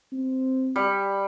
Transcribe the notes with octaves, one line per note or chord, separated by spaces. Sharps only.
C4
G3